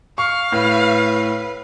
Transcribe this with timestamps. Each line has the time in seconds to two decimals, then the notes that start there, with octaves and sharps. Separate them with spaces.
0.18 F5 C#6
0.52 A2 B4